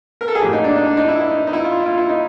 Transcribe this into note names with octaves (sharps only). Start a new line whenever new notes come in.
A#4
A4
G#4
A2 F#3 A#3 G4
D#4
D4
D#4
D4
D#4
E4
E4
D#4
D#4
E4
F4
E4
F4
E4
D#4